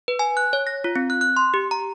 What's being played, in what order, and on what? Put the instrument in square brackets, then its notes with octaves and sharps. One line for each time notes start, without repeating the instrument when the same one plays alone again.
[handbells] B4
G#5
F#6
C#5
A#6
F4
C4
F#6
F#6
C6
G4
A#5